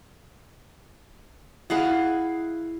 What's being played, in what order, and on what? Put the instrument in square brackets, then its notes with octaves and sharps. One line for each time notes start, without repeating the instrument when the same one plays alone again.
[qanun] E4 G#4 F5 F#5